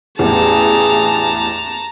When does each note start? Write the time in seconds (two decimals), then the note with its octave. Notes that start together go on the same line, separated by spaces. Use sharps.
0.19 A1 E2 G#4 A5 A#5